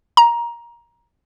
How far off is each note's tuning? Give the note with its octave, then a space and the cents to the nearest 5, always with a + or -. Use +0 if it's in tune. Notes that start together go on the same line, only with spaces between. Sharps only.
A#5 +15